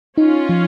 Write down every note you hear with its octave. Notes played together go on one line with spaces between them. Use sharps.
C#4 D#4 F4
F3